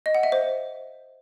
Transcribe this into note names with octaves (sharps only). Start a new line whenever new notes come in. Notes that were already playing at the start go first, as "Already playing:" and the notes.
D#5
F#5
E5
C5